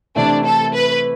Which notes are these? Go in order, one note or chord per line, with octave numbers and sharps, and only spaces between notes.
C3 E3 A3 D4 E4
A4
B4